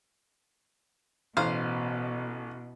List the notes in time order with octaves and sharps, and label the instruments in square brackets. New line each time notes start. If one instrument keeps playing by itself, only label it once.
[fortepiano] A1 [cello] B2 [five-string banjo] C5 F5